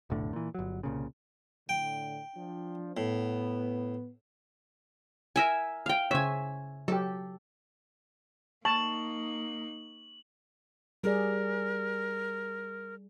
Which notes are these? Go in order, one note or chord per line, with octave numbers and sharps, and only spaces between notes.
F1 B1 A2 D3
A#2 E3
G1 F#3
C2 A#2 C#3
A2 D3 G5
F3 D4
A2 B3
A#4 E5 G#5
F5 G5
C#3 C5 C#5 E5 G#5
F#3 G4 A4
A#3 D#4 A5 C#6 F#7
G3 G#4 A#4 D5